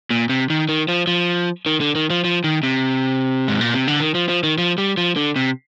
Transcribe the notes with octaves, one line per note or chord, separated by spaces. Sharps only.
A#2
C3
D#3
D#3
F3
F3
D#3
D3
D#3
F3
F3
D#3
C3
G#2
A#2
C3
D3
D#3
F3
F3
D#3
F3
G3
F3
D3
C3